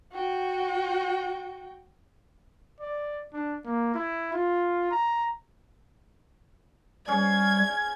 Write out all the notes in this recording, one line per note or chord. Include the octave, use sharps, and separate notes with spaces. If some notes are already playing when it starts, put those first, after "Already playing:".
F#4 G5
D5
D4
A#3
E4
F4
A#5
G3 C#4 G#4 G#6